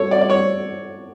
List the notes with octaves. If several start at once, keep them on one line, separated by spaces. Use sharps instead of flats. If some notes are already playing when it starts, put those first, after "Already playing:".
Already playing: A4 C#5
D5
D5
C#5